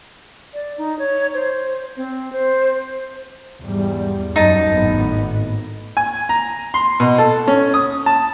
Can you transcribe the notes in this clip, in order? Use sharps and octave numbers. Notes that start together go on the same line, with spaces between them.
D5
D#4
C#5
C5
C4
C5
E2 G#2 G3
F#2 D#4 A5
G#1 A2 B3
G#5
A#5
C6
B2
A4
C#4
D#6
A5